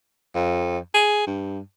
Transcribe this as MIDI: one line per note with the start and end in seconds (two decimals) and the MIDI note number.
0.35 0.78 41
0.94 1.23 68
1.27 1.59 43